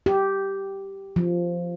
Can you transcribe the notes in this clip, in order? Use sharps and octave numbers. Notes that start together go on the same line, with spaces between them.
G4
F3